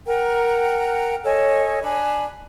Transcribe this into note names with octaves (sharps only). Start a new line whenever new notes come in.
A#4 F#5 G5 A#5
A4 C#5 D#5 G#5
D4 G#5 B5